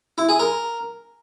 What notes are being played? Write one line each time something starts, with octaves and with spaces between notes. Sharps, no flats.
E4
G#4
A#4